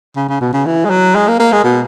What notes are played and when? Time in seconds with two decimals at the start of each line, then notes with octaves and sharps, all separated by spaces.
0.16 C#3
0.29 C#3
0.41 B2
0.53 C#3
0.66 E3
0.85 G#3
0.90 F#3
1.15 G#3
1.28 A#3
1.39 A#3
1.52 G#3
1.64 B2